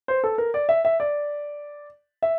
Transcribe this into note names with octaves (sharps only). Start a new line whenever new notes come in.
C5
A4
A#4
D5
E5
E5
D5
E5